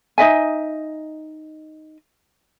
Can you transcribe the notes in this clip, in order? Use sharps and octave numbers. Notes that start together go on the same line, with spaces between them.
D#4 D#5 E5 G#5